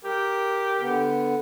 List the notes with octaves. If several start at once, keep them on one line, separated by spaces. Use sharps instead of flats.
G4 A#4
D3 B3